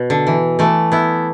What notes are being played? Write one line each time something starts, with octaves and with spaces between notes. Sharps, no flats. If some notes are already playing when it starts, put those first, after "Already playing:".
Already playing: B2
D3
E3
E3 A3
B3 E4